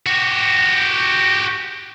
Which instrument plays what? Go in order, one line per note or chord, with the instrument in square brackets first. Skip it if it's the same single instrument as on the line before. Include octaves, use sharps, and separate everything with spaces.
[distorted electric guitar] F#4 G4